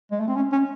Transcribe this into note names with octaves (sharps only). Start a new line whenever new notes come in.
G#3
A3
C4
C#4
C#4